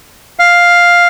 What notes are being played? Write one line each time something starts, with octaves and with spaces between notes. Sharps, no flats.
F5